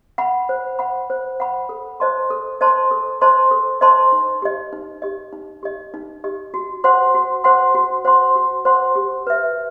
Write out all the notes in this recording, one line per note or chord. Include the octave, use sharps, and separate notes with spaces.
F#5 B5
C5
F#5 B5
C5
F#5 B5
A4
C5 D#5 A5 C6
A4
C5 D#5 A5 C6
A4
C5 D#5 A5 C6
A4
C5 D#5 A5 C6
D#4
G4 D#5
D#4
G4 D#5
D#4
G4 D#5
D#4
G4 D#5
F#4
C5 F#5 C6
F#4
C5 F#5 C6
F#4
C5 F#5 C6
F#4
C5 F#5 C6
G4
B4 E5